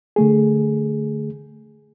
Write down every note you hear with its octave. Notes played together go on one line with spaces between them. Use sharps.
D3 A3 G#4